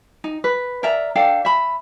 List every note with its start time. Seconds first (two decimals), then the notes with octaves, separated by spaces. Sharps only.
0.24 D#4
0.44 B4
0.83 A#4 D5 E5 A#5
1.15 D4 A4 F5 G5
1.45 E5 B5